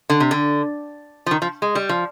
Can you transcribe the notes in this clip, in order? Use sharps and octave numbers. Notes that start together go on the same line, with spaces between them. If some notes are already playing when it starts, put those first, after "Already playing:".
D3
C3
D3
F3
D#3
F3
G#3
G3
F3